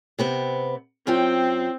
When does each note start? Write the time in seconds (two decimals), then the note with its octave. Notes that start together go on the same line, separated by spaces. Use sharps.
0.19 C3 B3 C4
1.07 F#2 C4 F4 G5